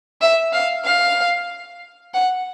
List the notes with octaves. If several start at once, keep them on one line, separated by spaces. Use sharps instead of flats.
E5
F5
F5
F#5